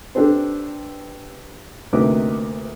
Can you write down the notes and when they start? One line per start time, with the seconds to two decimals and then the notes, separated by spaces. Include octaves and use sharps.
0.15 D4 G4 A4 B4 C5
1.93 D2 C3 A#3 D#4 B4 D6